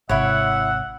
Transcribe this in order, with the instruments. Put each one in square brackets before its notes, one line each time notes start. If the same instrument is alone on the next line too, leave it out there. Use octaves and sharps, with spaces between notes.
[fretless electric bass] G#1 C3 [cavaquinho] E4 C#5 [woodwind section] E5 F#5